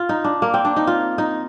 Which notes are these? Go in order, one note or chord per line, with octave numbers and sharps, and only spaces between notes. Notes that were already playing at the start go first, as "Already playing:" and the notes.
Already playing: F4
D#4
D4
A#3
C4
D4
D#4
F4
D#4